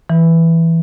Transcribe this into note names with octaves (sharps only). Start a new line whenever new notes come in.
E3